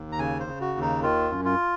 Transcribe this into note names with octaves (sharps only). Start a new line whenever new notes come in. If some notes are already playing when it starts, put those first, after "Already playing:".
Already playing: D#2
A#5
C#3 G#5
C5
C#3
F#4
D#2
D#4
D#3 F4
F#2
F4